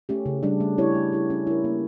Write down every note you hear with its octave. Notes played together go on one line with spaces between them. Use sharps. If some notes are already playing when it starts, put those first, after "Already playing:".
A3 C#4 G4
C#3
G3 D4
A3
C#4 E4 G4 C#5
A3
E4 G4
C#4
E4 A#4
A#3